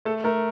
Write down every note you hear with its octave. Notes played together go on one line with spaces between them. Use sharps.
A3 A4
A3 A#4